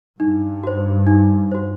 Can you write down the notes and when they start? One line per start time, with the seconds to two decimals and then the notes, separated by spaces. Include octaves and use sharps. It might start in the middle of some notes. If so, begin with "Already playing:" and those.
0.20 G2 D#4
0.63 F#4 C5
1.07 D#4
1.51 F#4 C5